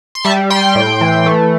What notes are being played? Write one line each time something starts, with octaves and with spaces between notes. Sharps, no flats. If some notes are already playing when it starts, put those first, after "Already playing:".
C6
G3 E5 A5
G3 G5 C6
A2
E3
A3